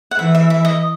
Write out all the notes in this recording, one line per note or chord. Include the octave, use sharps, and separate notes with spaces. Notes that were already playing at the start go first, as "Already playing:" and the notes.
F#5
E3 E5
E5
E5
D#5